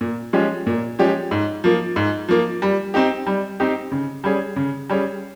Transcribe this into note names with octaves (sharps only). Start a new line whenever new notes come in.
A#2
F3 G#3 C#4 G4
A#2
F3 G#3 C#4 G4
G#2
F3 A#3
G#2
F3 A#3
G3
C4 D#4 G4
G3
C4 D#4 G4
C#3
G3 C#4 G#4
C#3
G3 C#4 G#4